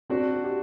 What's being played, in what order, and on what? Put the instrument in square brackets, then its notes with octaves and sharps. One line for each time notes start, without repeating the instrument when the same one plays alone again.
[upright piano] C4 [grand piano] D4 F#4
[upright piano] G4